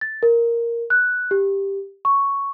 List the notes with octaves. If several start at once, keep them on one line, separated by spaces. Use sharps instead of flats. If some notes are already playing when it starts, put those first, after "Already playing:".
A6
A#4
F#6
G4
C#6